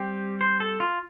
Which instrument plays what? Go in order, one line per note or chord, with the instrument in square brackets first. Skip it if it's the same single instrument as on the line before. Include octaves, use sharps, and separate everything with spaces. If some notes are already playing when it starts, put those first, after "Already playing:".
Already playing: [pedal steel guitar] G3 C4 G4
C5
A4
F4